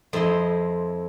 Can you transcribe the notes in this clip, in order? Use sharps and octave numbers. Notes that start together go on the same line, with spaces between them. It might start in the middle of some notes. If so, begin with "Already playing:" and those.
F2 C4 E4 D#5 C6